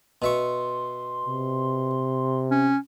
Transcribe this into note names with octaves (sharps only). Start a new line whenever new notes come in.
B2 E5 C6 C#6
C3
C#4